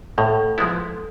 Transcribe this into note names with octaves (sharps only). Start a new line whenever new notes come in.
A2 A4
F3 G#3 B3 E4